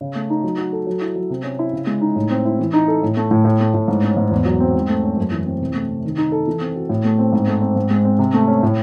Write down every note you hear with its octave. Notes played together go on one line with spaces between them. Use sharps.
C#3
A3
D#4
F#3
F#4
A4
F#3
E4
F#3
C3
C#4
E4
C#3
G#3
D#4
A2
C4
E4
E3
D#4
A4
A2
A3
A2
A2
A3
A2
G#2
C#4
G#2
E2
F#3
C4
G#2
A3
C#4
F#2
E3
C4
C3
A3
C3
D#3
D#4
A4
E3
C4
F#4
A2
A3
C4
G#2
A3
C4
G#2
G#3
C4
C3
A3
C#4
A2